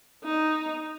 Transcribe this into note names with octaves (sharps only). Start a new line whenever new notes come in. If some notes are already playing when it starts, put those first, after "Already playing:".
D#4